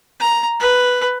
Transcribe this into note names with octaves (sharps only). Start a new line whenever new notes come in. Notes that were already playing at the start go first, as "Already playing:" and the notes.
A#5
B4